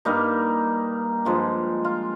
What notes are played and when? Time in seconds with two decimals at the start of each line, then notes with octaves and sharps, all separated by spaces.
0.05 G2 G3 A#3 D#4
1.25 G2 F3 G#3
1.85 F4